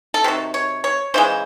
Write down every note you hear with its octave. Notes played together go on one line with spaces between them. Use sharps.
A4
C3 D#3 F#3
C#5
C#5
C#3 E3 G#3 C5